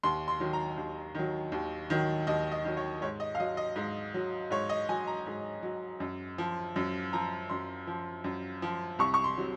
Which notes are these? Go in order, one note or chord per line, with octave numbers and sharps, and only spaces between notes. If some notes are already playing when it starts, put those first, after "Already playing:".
D#2 C6
C6
D#3 F#3
A#5
D#2
D#3 F#3
D#2
D#3 F#3
D#2 D#5
D#5
D#3 F#3
C#5
G#2 C#5
D#5
F5
F#3 D#5
D#5
G#2
F#3
G#2 C#5
D#5
F#3 G#5
A#5
G#2
F#3
F#2
F3
F#2
F3 A#5
F#2 C6
F3
F#2
F3
C2 C#6
C#6
C6
C3 F#3